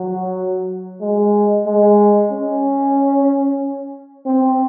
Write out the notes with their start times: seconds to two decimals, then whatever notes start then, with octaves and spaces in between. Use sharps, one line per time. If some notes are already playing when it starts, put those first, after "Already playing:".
Already playing: F#3
1.01 G#3
1.66 G#3
2.31 C#4
4.26 C4